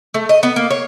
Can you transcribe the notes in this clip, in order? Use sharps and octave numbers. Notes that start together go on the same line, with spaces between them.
A3
D#5
B3
A#3
C#5